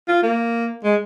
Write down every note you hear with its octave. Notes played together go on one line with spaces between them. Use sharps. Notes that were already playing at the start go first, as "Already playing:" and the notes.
F4
A#3
G#3